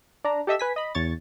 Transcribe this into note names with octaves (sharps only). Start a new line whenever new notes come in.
D4 A#5
G4 A4 D#5 E5 E6
B4 G#5 B6
D#5 B5
E2 C#5 C#6 A6